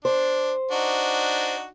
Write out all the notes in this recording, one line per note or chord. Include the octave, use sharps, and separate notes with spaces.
D4 C5
D4 D#4 F#4